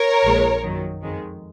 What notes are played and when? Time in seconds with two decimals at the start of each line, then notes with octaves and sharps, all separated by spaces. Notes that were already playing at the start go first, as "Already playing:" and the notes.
Already playing: A#4 C#5
0.24 A#1 A#2 G#3
0.63 F#2 D#3 F#3
1.02 F2 D#3 G#3